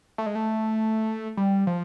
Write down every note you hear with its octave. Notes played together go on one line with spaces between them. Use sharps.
A3
G#3
A3
G3
F3